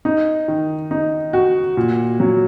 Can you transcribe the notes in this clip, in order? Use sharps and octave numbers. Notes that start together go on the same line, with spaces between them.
D#4
D#3
D#4
F#4
A#2
F#3